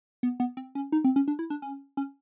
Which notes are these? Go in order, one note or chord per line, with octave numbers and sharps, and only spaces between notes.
B3
B3
C4
C#4
D#4
C4
C#4
D4
E4
D4
C#4
C#4